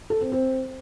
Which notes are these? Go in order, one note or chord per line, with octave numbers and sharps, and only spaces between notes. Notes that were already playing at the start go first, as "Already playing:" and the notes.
A4
C4
C4